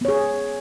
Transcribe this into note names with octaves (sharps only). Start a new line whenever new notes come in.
B3 G#4 C#5